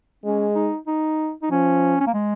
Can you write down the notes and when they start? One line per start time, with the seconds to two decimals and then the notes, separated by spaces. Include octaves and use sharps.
0.24 G#3 C#4
0.55 D#4
0.87 D#4
1.43 D#4
1.50 F3 C#4
2.00 C#4
2.07 A#3
2.14 G#3